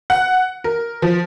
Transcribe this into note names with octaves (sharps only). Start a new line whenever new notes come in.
F#5
A#4
F3